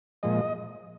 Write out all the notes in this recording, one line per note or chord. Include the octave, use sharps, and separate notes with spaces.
A#2 F3 G#3 D#5